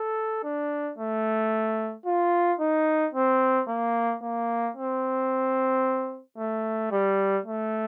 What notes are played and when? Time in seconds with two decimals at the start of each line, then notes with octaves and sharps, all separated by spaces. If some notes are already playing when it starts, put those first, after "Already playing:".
Already playing: A4
0.44 D4
0.98 A3
2.06 F4
2.60 D#4
3.14 C4
3.68 A#3
4.23 A#3
4.77 C4
6.38 A3
6.91 G3
7.46 A3